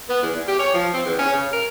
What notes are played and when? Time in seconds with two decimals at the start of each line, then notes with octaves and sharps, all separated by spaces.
0.09 B3
0.22 E2
0.36 E2
0.47 G4
0.59 C#5
0.74 F3
0.94 C4
1.06 E2
1.19 C#4
1.33 C#3
1.52 A#4